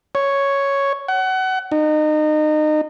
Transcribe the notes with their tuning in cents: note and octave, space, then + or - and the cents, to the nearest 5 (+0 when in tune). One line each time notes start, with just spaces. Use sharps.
C#5 +0
F#5 +25
D#4 -30